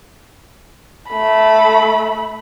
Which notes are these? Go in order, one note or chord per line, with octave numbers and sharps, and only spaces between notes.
A3 B5